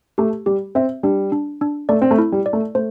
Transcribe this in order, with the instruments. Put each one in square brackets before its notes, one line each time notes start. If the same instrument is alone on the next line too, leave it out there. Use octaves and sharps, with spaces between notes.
[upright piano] A3 [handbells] G4
[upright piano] G3 [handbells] G4
[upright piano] C4 [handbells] E5
[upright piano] G3 [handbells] D4
[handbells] D4
D4
[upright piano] A3 [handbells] D5
[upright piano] C4
A3
[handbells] E4
[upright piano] G3
[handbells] D5
[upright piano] A3
[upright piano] A3 [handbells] C5